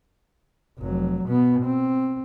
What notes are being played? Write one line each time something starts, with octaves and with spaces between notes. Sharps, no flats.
F1 F#3
B2 B3
C4